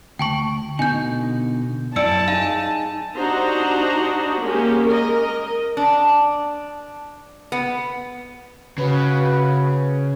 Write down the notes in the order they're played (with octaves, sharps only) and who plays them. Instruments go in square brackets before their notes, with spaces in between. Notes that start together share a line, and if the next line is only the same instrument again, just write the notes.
[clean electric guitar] D2 [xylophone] G5 A5 C#6
[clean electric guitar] B2 D3 D#4 [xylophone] G#5 G6
[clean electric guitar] F#2 E4 G5 [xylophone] D5 E6 C#7 [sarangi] A5
[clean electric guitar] D#4 G#4 [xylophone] F5
[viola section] D4 D#4 F#4 G4 C5 A#5
G#3 A#3 C#4 G4
A#4 D#5
[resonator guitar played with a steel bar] D4
B3
[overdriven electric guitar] C#3 [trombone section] F#4 B4